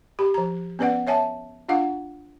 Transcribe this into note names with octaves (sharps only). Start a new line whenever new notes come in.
G4 B5
F3 A#5
B3 C#4 B4 D5 F#5
C#5 E5 G#5 A5
D4 F4 F5 F#5